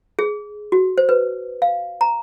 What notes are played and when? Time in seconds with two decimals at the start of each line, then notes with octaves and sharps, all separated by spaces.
0.19 G#4
0.72 F#4
0.98 C5
1.09 B4
1.62 F5
2.01 A#5